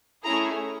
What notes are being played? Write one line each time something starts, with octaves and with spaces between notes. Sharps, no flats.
A3 C#4 E4 G#4 A#5